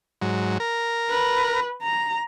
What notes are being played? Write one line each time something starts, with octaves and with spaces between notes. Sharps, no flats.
G#2 F#3
A#4
B4
A#5